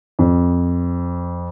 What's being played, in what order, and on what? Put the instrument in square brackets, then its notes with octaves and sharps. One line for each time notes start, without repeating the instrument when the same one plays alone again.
[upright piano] F2